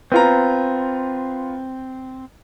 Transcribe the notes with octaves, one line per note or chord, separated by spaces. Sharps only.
B3 C4 F4 A#5